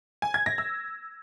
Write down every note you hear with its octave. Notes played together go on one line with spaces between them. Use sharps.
G#5
G#6
A#6
E6